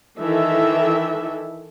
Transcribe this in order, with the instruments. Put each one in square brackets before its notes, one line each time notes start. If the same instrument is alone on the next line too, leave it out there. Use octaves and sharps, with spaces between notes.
[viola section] D#3 E3 A4 E5